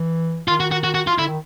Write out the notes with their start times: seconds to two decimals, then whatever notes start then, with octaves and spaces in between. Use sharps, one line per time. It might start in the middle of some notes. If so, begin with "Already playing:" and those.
Already playing: E3
0.48 D#3 F4
0.60 F#4
0.71 F#4
0.84 F#4
0.94 F#4
1.07 F4
1.18 D3 E4
1.28 D#3